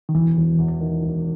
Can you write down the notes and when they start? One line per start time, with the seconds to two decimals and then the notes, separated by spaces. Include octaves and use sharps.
0.09 D#3
0.14 E1 E3
0.37 E1
0.58 E2
0.80 D#3
1.02 E1